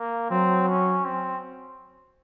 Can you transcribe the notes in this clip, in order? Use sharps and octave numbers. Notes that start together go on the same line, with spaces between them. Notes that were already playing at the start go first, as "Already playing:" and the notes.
Already playing: A#3
F#3 C4
C#4
C4